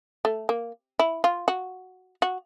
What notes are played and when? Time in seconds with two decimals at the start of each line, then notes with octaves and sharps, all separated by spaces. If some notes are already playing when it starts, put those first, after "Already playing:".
0.25 A3
0.49 A#3
0.99 E4
1.24 F4
1.48 F#4
2.22 F#4